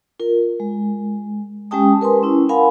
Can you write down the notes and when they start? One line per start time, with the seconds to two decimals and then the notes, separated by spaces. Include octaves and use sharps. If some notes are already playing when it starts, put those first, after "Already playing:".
0.20 F4 A#4
0.60 G#3
1.71 G#3 C#4 G4 G5 A5 D#6
2.01 A#4 B4 G#5 C6
2.23 C#4 E4
2.49 A#4 F5 F#5 G#5 B5